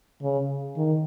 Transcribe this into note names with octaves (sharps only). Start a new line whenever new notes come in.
C#3
D#3